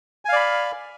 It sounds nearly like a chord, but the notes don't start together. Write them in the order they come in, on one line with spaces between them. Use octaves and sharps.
G#5 F5 D5 B5 F6